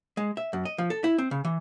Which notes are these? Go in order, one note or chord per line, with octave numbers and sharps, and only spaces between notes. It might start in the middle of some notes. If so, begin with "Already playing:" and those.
G#3
E5
F#2
D#5
F3
A4
E4
C4
C#3
E3